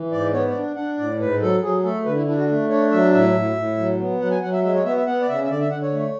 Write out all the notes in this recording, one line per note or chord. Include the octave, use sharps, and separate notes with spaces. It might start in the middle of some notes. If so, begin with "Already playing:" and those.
Already playing: E3
G#2 D5
B3 C#5
D5
D4
D4 F#5
A2 D5
G#2 B4
F#3 A4
F#3 G#4
A3 A4
D3 B4
E4
D4 E4
F#4
A3
D4 C#5
F#3 E5
A2 E5
A2
A2
F#3
B3
F#3 F#5
G#5
F#3 F#5
E5
G#3 E5
C#5
B3 E5
E5
B3 F#5
D5
C#3 E5
E5
D3 D5
E5
D3 F#5
C#5
A3